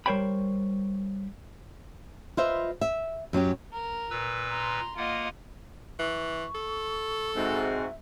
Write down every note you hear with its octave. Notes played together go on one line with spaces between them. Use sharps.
G3 A#4 C5 C#5 G5 B5
F4 B4 C5 D#5 E5
E5
F#2 F#3 C#4 G4
A#4
A#2 B4 E6
A#5 C6
A#3 F4 D#5 F#5
E3 C#6
A4
G#2 C4 F#4 E5